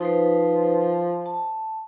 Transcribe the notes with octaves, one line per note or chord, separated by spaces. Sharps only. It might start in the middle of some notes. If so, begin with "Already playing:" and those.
F3 D#4 B4 C5
A5